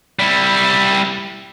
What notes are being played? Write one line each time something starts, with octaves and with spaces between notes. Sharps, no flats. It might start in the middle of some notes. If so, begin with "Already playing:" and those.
G3 E4